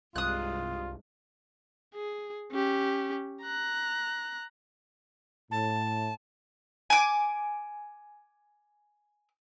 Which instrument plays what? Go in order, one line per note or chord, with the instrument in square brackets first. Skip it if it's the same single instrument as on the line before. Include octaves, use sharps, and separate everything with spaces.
[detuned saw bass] C2 [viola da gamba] G2 C3 G#3 [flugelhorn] F4 [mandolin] D#6 F#6
[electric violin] G#4
C#4 G4
A#5 F#6
[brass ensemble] A2 [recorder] A5
[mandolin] G#5 D6